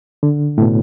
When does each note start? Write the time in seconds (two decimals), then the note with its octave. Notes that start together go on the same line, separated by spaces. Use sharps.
0.23 D3
0.58 A2
0.62 B2